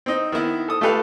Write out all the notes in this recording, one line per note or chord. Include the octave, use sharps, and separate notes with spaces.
C4 D#4
D#3 B3 E4
A4 D#6
A3 F4 G4 A4 B4 F5